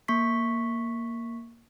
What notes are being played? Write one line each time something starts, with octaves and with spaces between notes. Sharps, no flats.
A#3 C#6 B6